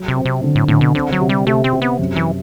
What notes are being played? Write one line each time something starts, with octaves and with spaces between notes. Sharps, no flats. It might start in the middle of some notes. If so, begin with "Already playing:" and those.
Already playing: F#3
C3
C4
C3
D3
A2
A2 D3
B2
D3 C4
F#3
C3
G3
C3 A3
C4
C3
B3
F#2
E3